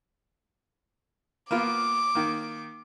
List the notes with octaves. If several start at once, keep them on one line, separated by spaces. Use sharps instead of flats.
A#3 B3 F4 D6
D#3 A#3